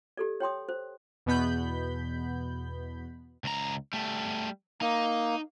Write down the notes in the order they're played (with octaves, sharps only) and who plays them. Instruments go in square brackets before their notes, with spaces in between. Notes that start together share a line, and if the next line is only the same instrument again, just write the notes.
[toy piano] G4 A4 D5
C#5 G5 C6 D#6
C5
[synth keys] E2 B2 B3 B5 G6
[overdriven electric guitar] C#2 A#5
G3 A3
[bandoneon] A#3 [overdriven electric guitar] D#4